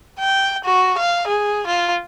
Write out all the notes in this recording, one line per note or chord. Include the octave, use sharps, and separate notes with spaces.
G5
F#4
F5
G#4
F4